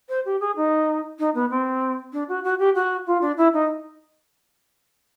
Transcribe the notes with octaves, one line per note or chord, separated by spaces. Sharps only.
C5
G4
G#4
D#4
D#4
B3
C4
D4
F#4
F#4
G4
F#4
F4
D4
E4
D#4